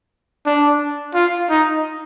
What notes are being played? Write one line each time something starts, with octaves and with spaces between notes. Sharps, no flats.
D4
F4
D#4